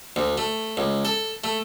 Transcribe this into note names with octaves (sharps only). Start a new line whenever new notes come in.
D2
A3
C#2
A4
A3